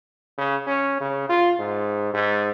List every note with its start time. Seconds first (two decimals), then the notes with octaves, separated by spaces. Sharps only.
0.37 C#3
0.67 C#4
1.00 C#3
1.29 F4
1.59 G#2
2.13 G#2